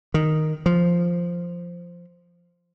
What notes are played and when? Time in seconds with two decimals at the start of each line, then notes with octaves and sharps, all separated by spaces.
0.14 D#3
0.66 F3